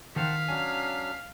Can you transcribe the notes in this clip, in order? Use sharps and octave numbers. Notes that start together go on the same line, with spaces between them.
D#3 C5 F5 F#5 A5 B6
F#3 C#4 D4 G#5